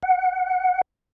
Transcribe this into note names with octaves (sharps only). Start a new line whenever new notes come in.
F#5